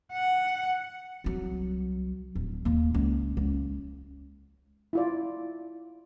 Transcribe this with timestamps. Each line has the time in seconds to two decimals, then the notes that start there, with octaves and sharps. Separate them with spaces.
0.12 F#5
1.24 C2 F#3
2.35 D1
2.65 D#2 A#3
2.94 C#2
3.37 C#2
4.93 E4 F4 D5